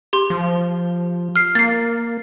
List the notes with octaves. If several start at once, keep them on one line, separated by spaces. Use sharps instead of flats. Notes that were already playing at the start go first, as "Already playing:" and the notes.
G4 C6
F3
F6 C7
A#3 A6 C7